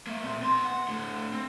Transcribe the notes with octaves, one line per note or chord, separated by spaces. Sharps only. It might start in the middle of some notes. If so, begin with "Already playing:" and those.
A#3 E5
A#2 C4
B3 C6
F#5
A2 D3
C4